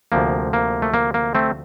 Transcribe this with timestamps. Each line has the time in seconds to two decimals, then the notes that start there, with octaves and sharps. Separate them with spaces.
0.12 D2 C3 F3 A#3
0.53 A#3
0.82 A3
0.94 A#3
1.14 A#3
1.35 A3 C4